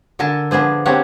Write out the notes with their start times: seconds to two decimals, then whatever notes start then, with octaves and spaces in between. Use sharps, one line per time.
0.19 D3 A4 A#4 G#5 A5
0.51 F3 B3 D4 G#4 C5
0.85 A#3 C4 D4 G4 C#5 F#5